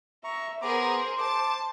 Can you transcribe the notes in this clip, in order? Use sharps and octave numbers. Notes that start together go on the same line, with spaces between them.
E5 A#5 C#6
B3 G#4 A#4 C5 A#5 D6
A5 D6